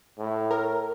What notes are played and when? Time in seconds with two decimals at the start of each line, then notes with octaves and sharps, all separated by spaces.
0.19 A2
0.51 A#4